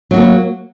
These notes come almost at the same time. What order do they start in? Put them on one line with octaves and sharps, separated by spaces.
F#3 F#4 A#3